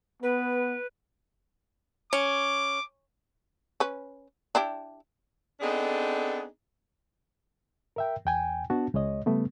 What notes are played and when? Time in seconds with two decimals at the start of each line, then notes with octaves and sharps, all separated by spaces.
0.23 B3 B4
2.13 C#4 D6
3.80 C#4 B4
4.55 D4 E4 G4
5.61 B3 C4 D4 D#4 G#4 A4
7.96 A#4 E5 G5
8.25 E2 G5 G#5
8.70 B3 D4 F#4 A5
8.94 C#2 G#3 C#5 D#5
9.26 C#3 G3 A3 B3